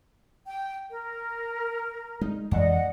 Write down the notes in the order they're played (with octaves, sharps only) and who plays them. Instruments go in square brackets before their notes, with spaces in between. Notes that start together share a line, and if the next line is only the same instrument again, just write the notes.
[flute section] G5
A#4
[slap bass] G#3 [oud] D#4
[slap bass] F2 E3 G#3 [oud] D4 [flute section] D#5 F#5